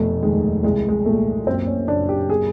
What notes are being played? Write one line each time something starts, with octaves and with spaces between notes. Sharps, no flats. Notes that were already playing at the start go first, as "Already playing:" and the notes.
Already playing: F1 B2 A3
D#2 G#3
C2 G#3
G#3
A#2 A3
F#2 C4
C#4
F#1 D4
G4
G#4